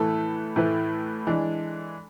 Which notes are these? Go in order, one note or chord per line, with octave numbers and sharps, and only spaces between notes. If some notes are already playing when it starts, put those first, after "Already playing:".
Already playing: A2 E3 A3 E4 A4 B4
A2 E3 A3 E4 B4
E3 G#3 D4